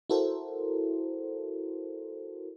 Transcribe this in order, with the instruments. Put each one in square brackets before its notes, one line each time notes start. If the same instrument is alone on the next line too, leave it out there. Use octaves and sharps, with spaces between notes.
[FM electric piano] E4 F#4 A4 A#4 C5